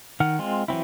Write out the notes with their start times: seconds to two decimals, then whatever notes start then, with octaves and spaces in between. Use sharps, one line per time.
0.20 D#3 F#5 F6
0.39 G#3 C4 F4
0.68 E3 F#3 C4 E4